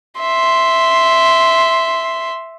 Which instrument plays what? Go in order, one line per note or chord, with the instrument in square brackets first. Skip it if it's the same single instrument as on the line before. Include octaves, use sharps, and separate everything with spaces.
[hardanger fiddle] E5 C6